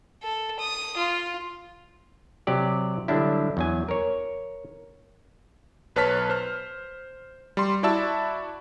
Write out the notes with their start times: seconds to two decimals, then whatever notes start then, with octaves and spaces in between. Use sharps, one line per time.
0.23 A4
0.60 D#6
0.97 F4
2.47 C3 F#3 G4 D5
3.08 D3 F#3 G3 D4 E4
3.57 E2 F#3 G#5
3.88 A#4 C#5
5.96 B1 B4 C#5 A5 F6 B6
6.30 C5 F6
7.57 G3 C6
7.83 E4 F#4 D5 E5 A5 E6